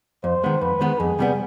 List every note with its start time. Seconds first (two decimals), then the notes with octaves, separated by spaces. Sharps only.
0.24 F2 C5
0.44 D#3 G#3 B3
0.61 F2 B4
0.81 D#3 G#3 B3
0.99 F2 G#4
1.19 C3 G3 B3